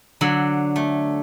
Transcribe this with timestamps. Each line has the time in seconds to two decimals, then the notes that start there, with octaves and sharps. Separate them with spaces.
0.21 D3 F#3
0.76 A3